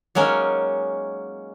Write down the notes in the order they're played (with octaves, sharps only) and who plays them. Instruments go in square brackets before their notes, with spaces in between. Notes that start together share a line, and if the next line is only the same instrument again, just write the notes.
[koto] F#3 G#3 A#3 C#4 D#4